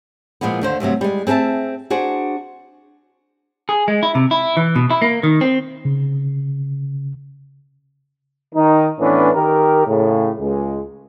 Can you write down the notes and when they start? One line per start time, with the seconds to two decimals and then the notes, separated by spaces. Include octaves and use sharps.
0.41 A#2 F3 G#3 A#3 B3
0.61 D#2 D3 C5
0.80 D2 G2 C3 F#3
1.01 G3 G#3
1.27 C4 G#4 A#4 E5 A5
1.90 D4 F#4 G#4 C5
3.69 G#4
3.88 G#3
4.03 E4
4.15 C3
4.31 E4
4.57 E3
4.76 B2
4.90 E4
5.02 A#3
5.23 D#3
5.41 C4
5.85 C#3
8.54 D#3 D#4
8.99 A2 E3 B3 C#4 D4
9.34 D#3 G4 A#4
9.86 A2 C#3
10.39 C#2 G#3